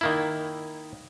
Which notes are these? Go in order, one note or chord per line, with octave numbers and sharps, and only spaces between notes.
D#3 A#3 E4